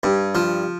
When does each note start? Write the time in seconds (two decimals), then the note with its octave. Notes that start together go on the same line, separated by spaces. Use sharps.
0.03 G2
0.35 F3